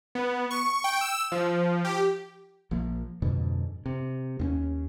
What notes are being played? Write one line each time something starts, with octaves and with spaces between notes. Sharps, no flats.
B3
C#6
G5
E6
F3
G4
A#1 F3 A#3
F2 G#2 B2 D3
C3
D#2 C4 C#4